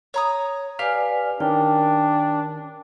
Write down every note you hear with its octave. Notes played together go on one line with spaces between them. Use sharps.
C#5 A#5 D#6
G4 B4 D5 F5 G#5 F6
D#3 C#4 D4 A#4 G5